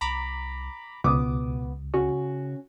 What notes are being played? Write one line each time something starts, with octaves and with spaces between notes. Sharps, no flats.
C2 A#5 B5 D6
C#2 B2 B3 D6 D#6
C#3 C#4 F#4